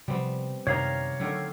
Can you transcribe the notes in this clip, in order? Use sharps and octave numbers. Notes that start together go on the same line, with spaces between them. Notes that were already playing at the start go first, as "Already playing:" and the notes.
C3 F3 G3 B3 C4
F#2 C3 D#3 D4 C#5 F5 A#5
D3 D#3 F#3 A3